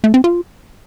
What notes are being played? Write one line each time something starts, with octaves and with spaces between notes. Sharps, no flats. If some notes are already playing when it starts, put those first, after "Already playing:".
A3
C4
F4